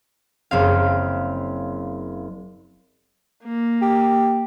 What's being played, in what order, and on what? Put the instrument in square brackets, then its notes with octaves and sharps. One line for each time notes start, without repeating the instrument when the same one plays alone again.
[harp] F#1 C4 F5
[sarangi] A#3
[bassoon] G4